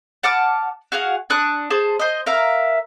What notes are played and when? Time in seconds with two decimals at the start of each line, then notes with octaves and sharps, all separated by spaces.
0.23 F#5 A5 D6 F6
0.92 F#4 G#4 F5 F#5
1.30 D4 C#6 D#6 F#6
1.70 G#4 C5 A5
1.99 C5 D#5
2.26 A#4 E5 F5